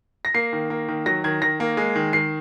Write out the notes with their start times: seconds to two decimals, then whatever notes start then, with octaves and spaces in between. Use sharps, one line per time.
0.25 A#6
0.34 A#3 C7
0.53 D#3
0.70 A#3
0.88 D#3
1.06 F#3 A#6
1.24 D#3 G#6
1.41 D#3 A#6
1.60 A#3
1.77 G#3
1.96 D#3
2.13 D#3 C7